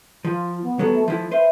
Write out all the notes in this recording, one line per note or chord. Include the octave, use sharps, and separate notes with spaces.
F3 F4
B3
F#3 G3 B3 A4
A3
F3 A3 E4
B4 C5 E5